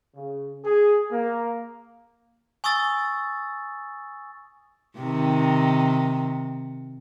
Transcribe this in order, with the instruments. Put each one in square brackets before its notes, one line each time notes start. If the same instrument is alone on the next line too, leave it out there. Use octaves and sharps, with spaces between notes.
[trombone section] C#3
G#4
A#3
[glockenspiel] G#5 C#6 D#6 E6 A6
[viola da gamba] C3 D#3